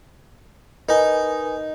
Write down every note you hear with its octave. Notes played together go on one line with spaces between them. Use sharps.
D#4 A#4 B4 G#5